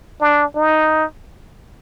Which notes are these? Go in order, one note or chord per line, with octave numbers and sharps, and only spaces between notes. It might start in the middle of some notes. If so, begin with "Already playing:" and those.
D4
D#4